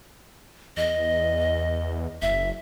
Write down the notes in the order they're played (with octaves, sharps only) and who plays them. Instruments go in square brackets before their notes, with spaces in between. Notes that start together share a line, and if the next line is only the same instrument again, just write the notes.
[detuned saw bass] E2 [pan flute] D#5
[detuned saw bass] F#1 [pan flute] E5